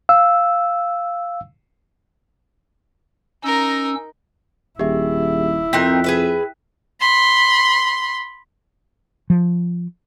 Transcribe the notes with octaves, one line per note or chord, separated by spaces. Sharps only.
F5 E6
C#4 D#4 A#4 E6
D#1 E4 G4 G#4 E5
F2 C4 D#4 A#4 G5 F#6 B6
G#4 B4 E5
B5 C6
F3